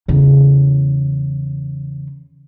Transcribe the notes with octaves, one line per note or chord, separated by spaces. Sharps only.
E2 C#3